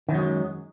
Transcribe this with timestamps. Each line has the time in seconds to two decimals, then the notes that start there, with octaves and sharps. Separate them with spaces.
0.09 D#3
0.11 F#2
0.14 F#3
0.17 G#3